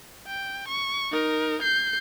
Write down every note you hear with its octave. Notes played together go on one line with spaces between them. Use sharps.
G5
C#6
D#4 A#4
G6 C7